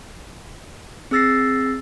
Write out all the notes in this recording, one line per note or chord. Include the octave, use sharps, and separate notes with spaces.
C4 G#4 E6 A6 A#6 C7